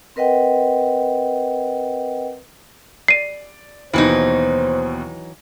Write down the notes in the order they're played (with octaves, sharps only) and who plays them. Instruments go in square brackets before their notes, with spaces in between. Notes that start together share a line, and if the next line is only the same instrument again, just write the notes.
[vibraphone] C4 A#4 B4 D#5 F#5 G5
[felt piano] D5 [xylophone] C7 D#7
[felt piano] D#2 B2 [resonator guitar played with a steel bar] E3 F#3 D#4 [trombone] C5